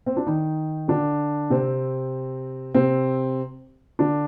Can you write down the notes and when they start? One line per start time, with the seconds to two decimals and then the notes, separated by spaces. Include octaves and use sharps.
0.06 C4
0.17 D4
0.27 D#3 D#4
0.88 D3 D4
1.50 C3 C4
2.74 C3 C4
3.99 D3 D4